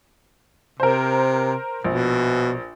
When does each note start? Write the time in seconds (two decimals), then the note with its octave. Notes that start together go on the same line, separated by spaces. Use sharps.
0.80 C3 A#4 C5
1.84 A#1 B2